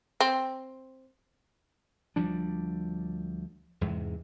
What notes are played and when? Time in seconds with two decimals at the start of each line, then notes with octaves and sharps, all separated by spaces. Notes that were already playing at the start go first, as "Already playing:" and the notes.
0.21 C4
2.16 D2 F3 G3 D4
3.81 E2 G#2 C3